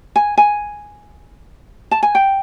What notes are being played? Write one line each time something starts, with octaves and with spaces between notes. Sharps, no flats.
G#5
G#5
A5
G#5
G5